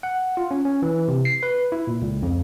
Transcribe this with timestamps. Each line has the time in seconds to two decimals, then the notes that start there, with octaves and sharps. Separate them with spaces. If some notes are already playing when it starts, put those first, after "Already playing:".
0.03 F#5
0.37 F4
0.51 C#4
0.65 C#4
0.82 E3
1.08 C3
1.25 C7
1.43 B4
1.72 E4
1.87 A#2
2.02 C#2
2.22 F2